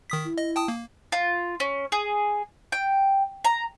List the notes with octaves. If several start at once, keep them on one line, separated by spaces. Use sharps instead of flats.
D#3 D#6 B6
E4
D#5
G5 A5 D#6
A#3
F4
C#4
G#4
G5
A#5